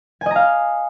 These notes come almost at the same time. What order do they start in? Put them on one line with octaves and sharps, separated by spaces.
G#5 D#5 A#5 F5